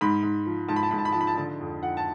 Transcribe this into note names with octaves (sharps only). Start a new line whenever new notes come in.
G#2 B5
G#2
F3
G#2 A5
B5
A5
G#2 B5
A5
B5
F3 A5
B5
A5
D3 A5
F2
F2 F#5
A5